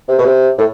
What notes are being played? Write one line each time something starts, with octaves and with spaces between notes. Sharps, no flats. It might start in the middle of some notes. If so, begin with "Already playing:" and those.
C3
B2
C3
A2